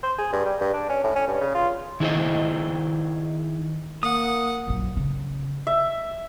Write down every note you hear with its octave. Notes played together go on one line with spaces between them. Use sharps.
C5
G#4
G2
G3
G2
D4
C#4
A2
C#4
G2
C#3
F4
D#3 E4 G#4 C5 D#5
A#3 F#5 D#6
A#1 F#2
C#3
E5